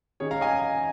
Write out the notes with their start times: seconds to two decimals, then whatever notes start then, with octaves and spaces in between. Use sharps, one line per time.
0.20 D#3 C#4 G#4 C#5
0.31 F5 A#5
0.41 D#5 G#5